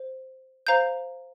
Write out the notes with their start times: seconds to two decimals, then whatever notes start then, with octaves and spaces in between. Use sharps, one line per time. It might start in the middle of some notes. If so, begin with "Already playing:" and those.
Already playing: C5
0.67 C5 F5 A#5 G6